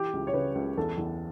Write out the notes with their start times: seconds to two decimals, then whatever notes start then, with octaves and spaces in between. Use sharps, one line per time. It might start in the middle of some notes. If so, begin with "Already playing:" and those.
Already playing: E3 G4
0.14 C#2
0.27 C#5
0.34 C#3 B4
0.55 C#2
0.77 E2 A4
0.98 E2